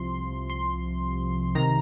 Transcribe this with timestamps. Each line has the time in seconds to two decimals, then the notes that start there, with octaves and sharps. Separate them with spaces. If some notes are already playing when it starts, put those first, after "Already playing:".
Already playing: C2 C3 F3 C6
0.50 C6
1.55 C3 D#3 A#5